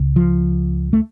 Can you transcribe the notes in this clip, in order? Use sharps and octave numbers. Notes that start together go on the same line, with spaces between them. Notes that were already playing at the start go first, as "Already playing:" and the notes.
Already playing: C#2 C#3
F3
A3